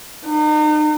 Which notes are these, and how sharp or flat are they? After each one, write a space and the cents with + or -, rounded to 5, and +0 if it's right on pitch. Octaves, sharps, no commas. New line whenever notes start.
D#4 -40